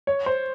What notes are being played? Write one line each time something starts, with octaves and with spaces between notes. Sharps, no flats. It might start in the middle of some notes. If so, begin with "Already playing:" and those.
C#5
C5